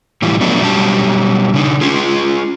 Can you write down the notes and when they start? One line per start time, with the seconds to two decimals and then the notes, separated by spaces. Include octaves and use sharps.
0.22 A2 E3 G3 F4
0.41 F3 F#3 A3 B3 D4
0.61 B2 F#3 G3 C#4 G4 A5
1.54 C#3 D4 D#4
1.81 C#4 F4 G#4